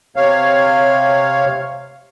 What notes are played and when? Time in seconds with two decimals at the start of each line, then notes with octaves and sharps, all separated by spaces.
0.16 C3 C#5 F5